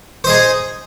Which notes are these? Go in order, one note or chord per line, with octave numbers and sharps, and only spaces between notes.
D#4 G#4 C5 D#5